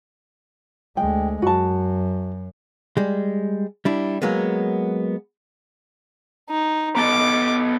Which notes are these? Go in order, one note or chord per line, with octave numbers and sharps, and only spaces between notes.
D2 G#3 G5
F#2 F#4 A5
G3 G#3
G3 D4 E4
F#3 G#3 A#3 B3
D#4
B3 A4 D#5 D6